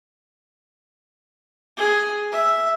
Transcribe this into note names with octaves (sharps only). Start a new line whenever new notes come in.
G#4
E5